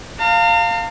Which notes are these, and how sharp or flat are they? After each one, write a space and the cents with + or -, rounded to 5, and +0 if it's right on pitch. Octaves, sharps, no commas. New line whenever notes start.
F5 +0 A#5 -45